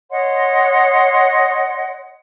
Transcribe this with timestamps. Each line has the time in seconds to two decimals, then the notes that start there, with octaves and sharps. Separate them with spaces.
0.10 C#5 D#5 F#5 C6